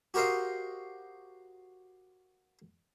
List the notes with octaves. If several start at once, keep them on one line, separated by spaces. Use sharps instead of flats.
F#4 G4 A#4 C5 D#5 F5